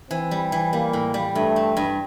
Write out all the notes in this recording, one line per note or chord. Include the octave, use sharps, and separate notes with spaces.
E3 C4
G3
E3
G3 A#3
A2
G3
G2 A3
C4
G2